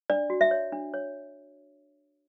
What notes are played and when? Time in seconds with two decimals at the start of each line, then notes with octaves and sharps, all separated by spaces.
0.10 D4 D5
0.30 F#4
0.41 E5
0.51 C#5
0.72 D4
0.94 C#5